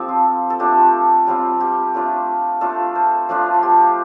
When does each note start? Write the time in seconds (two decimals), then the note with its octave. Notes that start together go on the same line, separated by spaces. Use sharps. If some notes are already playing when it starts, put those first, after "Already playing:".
Already playing: F3 C4 G4 A4
0.09 F4
0.50 A4
0.59 A3 D4 F4 G4
1.27 G3 C4 F4
1.61 G4
1.94 A3 D4 F4
2.61 A3 D4 F4 A4
2.95 C5
3.29 F3 A3 D4 F4
3.54 F4
3.63 G4